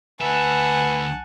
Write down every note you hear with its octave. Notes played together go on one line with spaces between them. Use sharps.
D2 B4 E5 F#5 G#5 A5